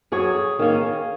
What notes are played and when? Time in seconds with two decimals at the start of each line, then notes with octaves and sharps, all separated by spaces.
0.12 F#2 G#4 C#5
0.59 D#3 A#3 C#4